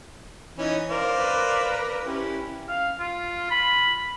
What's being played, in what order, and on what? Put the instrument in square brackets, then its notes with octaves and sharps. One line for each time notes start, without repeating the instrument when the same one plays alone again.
[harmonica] E3 C#4 D#4
[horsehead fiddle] A#4 [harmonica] C5 D5 F5
[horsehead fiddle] A#4 B4
[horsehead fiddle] C#4 [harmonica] E4 G4
[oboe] F5
F4
B5